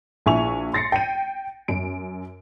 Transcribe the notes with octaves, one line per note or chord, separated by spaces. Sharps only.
A#1 E4 G#5 C#6 F7
C6 A6 A#6 C7 C#7
G5 D#7
F#2 D7